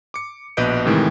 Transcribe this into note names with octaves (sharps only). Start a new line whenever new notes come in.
D6 C#7
A#1 B2 B4 D#5 G6 D7
A2 C3 D#3 E3 G#3